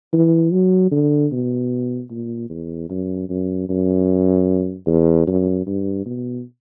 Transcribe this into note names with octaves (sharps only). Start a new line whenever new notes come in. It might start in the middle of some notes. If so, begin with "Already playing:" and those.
E3
F#3
D3
B2
A#2
E2
F#2
F#2
F#2
E2
F#2
G2
B2